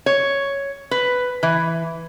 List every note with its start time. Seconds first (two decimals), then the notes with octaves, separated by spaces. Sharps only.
0.06 C#5
0.91 B4
1.43 E3